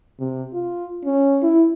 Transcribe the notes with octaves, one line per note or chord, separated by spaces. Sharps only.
C3
F4
C#4
E4